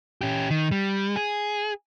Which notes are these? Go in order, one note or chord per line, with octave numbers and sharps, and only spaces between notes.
C#4 G4
D#3
G3
G#4